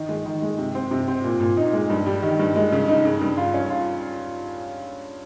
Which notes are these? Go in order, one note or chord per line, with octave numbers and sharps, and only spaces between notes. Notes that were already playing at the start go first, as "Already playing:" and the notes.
Already playing: D#3
G#3
D#3
G#3
C3
C4
C3
C4
A#2
A#2
D#4
G#3
G2
G3
D#3
G2
G#3
C#3
D#4
C#3
G2
F4
C#4
F4